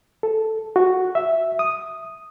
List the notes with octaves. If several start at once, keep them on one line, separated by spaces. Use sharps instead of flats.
A4
F#4
E5
D#6